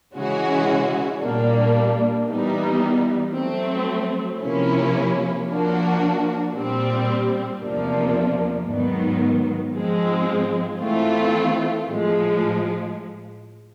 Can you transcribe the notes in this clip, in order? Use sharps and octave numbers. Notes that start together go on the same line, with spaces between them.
C#3 E3 G#3 C#4 F#4
A#2 G3 A#3 D4
E3 G3 B3 D#4
F#3 A3 C4
C3 F3 A#3 C#4 E4
F3 A#3 D4 F#4
A#2 G3 C4
E2 C3 F3 A#3 D4
G#2 D#3 F#3 B3
G#2 F3 G#3 C4
E3 A3 C4 F4
A2 F3 G#3